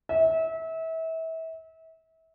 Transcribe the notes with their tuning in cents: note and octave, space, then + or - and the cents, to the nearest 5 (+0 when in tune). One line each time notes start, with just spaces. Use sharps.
E5 -30